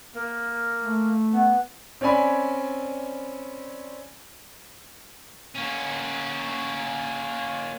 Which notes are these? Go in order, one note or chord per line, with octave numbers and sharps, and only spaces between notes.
A#3
A3
B3
C4 C#4 D5 G#5 B5
A#3 C#4